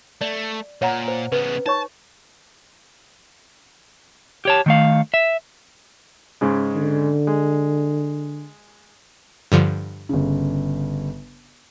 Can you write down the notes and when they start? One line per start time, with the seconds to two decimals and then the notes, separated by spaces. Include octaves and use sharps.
0.21 A3 D5
0.82 A#2 C#5 F#5 A#5
1.08 C5
1.32 C#3 B3 B4
1.66 D#4 C#5 A5 C#6
4.45 G4 C#5 A5
4.66 D#3 A3 F5
5.14 E5
6.41 G#2 C#3 G#3
6.76 D3
7.27 G#3
9.52 G2 D3 F3
10.09 G1 C#3